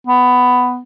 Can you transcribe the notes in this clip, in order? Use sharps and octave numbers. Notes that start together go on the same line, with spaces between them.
B3